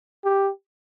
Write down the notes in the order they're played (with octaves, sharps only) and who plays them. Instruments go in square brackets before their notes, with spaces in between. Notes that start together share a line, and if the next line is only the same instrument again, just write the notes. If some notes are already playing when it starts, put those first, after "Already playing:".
[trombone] G4